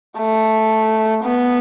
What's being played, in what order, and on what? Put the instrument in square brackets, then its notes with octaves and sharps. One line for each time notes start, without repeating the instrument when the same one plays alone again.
[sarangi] A3
B3